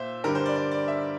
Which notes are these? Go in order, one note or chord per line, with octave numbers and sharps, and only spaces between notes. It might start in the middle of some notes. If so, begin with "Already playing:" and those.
Already playing: A#2 C5 E5 F5
G2 D3 G3 A#4
C5
D5
D5
D5
E5